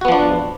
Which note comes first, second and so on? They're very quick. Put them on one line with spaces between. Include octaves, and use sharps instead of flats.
F#4 B3 F3 D4